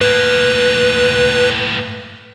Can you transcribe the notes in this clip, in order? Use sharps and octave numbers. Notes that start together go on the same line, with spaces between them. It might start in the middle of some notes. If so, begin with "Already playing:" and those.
A2 A#3 B4